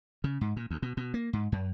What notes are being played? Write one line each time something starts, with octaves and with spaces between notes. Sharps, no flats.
C#3
G#2
A#2
D2
B2
B2
A#3
G#2
F#2